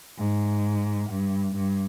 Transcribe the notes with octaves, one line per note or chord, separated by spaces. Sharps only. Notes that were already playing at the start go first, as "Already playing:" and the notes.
G#2
G2
G2